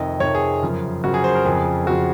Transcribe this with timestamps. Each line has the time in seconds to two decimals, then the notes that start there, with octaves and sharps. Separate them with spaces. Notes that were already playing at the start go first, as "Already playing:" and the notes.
Already playing: F2 C3 D#3 D#5
0.20 F2 C3 D#3 C#5
0.35 G#4
0.63 F#2 C#3 F3
1.04 F#2 C#3 F3 F#4
1.14 G#4
1.24 C5
1.35 A#4
1.45 F2 C#3 F3 G#4
1.86 F2 C#3 F3 F#4